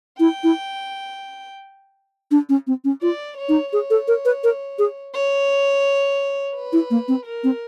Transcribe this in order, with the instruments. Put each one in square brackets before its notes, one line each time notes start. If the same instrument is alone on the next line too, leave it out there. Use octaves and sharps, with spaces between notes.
[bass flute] E4 [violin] G5
[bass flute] E4
D4
C#4
C4
C#4
[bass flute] F4 [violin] D5
[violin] C#5
[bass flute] D#4
[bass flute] G#4 [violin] C#5
[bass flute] A4
A#4
B4
A#4
G#4
[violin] C#5
B4
[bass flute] E4
A#3
C4
[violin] A#4
[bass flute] C4